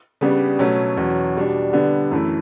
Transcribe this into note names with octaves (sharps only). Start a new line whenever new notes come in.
C#3 G3 B3 D4
B2 F#3 A3 C#4
E2 B2 F#3 C#4
B2 G3 D4
D3 G3 B3 D4
F#2 E3 A3 E4